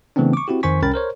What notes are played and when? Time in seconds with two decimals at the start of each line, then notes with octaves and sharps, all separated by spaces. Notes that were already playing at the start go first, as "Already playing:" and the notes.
0.16 C#3 E3 A3 B3 C4 D4
0.33 C#6 D6
0.48 C4 E4 F#4 G4
0.63 F2 D#3 C5 G#5 C#6 B6
0.82 C2 C#4 A#4 G5 B5 A6
0.94 A#4 C5 C#5